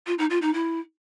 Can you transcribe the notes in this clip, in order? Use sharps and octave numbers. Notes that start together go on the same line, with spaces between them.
F4
D#4
F4
D#4
E4